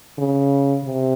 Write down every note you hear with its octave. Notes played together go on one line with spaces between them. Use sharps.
C#3
C3